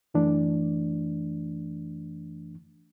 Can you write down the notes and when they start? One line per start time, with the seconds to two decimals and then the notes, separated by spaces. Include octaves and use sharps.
0.14 F#2 E3 A3 D4